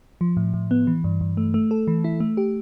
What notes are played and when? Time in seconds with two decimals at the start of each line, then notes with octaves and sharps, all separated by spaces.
0.21 F3
0.37 A2
0.54 A2
0.71 B3
0.87 E3
1.04 G2
1.21 G2
1.37 A3
1.54 A3
1.71 A4
1.87 E3
2.04 E4
2.20 A3
2.37 G4